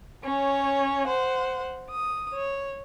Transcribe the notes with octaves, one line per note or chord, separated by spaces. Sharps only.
C#4 C#5
C5 F#5
D#6
C#5